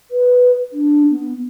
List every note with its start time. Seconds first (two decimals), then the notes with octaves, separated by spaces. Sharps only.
0.11 B4
0.73 D4
1.11 B3